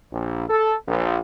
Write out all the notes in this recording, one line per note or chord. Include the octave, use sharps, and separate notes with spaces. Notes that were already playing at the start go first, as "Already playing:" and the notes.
A#1
A4
A#1